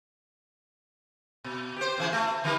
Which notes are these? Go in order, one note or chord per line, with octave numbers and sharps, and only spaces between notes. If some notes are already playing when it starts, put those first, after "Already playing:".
B2
G4 C5
F#2 E3 G#4
A3
D#3 E3 G3